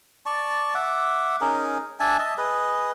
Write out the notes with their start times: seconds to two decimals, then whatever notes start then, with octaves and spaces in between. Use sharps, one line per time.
0.26 D5 A5 C#6
0.75 E5 F#5 D6
1.41 C#4 D#4 G#4 A#4
2.00 D4 E5 G#5 A5
2.19 D#5 E5 A5
2.38 G#4 B4 D#5